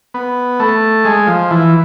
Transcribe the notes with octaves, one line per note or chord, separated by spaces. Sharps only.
B3
A3
G#3
F3
E3